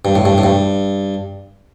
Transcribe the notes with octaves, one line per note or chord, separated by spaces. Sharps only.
G2
A2
G2
A2
G2